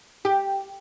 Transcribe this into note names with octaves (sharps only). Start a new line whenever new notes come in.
G4